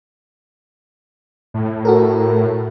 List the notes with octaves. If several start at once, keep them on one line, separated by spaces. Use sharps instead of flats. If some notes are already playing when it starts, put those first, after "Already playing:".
A2
F#4 A4 A#4